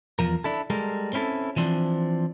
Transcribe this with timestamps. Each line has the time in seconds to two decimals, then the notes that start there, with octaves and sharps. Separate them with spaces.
0.19 E2 F3 A#4
0.44 D4 E4 A4
0.70 G3 G#3 A4 A#4
1.13 C4 C#4 E4 G#4 A4
1.56 E3 F3 C4 D4